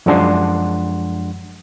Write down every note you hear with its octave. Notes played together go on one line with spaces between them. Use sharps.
F#2 F3 G#3 D4 F#5 C6